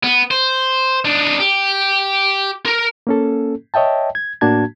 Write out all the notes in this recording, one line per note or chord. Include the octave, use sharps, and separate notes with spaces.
B3
C5
D4 D#4
G4
A#4 A#5
A#3 C#4 A4
C#5 D#5 E5 G5 A5
G#6
A2 A#3 D4 F#4 A5 G#6